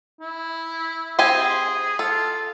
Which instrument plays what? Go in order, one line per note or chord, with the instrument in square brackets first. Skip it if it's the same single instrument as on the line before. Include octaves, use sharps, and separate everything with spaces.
[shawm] E4
[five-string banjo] C4 G4 G#5 [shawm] G#4
[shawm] F4 [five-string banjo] A4